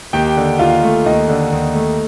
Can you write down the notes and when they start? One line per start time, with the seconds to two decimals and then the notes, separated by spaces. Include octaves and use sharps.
0.13 D#2 G4 G5
0.36 D3
0.59 D#2 F4 F5
0.83 A3
1.05 D#2 D#4 D#5
1.29 D3
1.52 D#2
1.75 A3